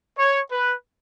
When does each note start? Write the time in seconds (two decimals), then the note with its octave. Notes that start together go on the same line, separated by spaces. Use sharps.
0.17 C#5
0.51 B4